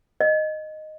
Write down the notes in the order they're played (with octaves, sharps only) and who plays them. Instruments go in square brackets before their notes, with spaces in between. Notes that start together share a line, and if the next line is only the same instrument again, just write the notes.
[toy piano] D#5